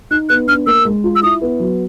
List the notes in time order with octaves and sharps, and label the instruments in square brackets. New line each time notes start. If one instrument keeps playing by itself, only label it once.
[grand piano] D#4 [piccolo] F#6
[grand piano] B3 [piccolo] F#6
[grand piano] D4 [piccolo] F6
[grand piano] A#3 [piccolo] E6
[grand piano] G#3
F4
[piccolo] E6
[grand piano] E4 [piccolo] D#6
[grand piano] B3
F#3